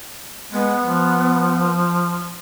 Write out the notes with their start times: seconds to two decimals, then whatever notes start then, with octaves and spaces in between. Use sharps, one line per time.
0.53 G#3 B3
0.84 F3